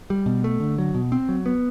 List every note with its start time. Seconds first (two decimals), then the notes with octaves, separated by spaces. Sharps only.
0.10 G3
0.26 B2
0.44 A3
0.60 D3
0.78 F#3
0.94 B2
1.12 C4
1.29 F#3
1.46 B3